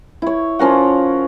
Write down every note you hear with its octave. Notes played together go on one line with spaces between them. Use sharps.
E4 C#5
F3 C#4 A#4 F#5